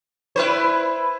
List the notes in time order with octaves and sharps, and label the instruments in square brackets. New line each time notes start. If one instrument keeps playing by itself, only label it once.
[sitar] E4 B4 C5